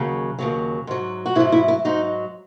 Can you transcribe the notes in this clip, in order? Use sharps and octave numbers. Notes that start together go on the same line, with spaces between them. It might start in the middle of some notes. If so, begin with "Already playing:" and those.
Already playing: D#2 C#3 F#3
D#2 C#3 F#3
G#2 F#3
F#4
G#2 F#3 E4
E4
E4
G#2 F#3 D#4